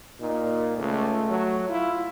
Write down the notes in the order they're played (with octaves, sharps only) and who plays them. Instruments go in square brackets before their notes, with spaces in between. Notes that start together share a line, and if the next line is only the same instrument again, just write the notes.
[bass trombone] A#2 [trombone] D#4
[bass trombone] C#2 [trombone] A3
[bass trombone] F#3
[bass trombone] E4 [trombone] F4